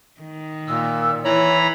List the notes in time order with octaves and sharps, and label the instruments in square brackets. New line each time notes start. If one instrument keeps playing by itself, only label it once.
[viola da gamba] D#3
[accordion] A#2 [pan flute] E6
[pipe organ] E3 A#5 B5 [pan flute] E4 [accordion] C#5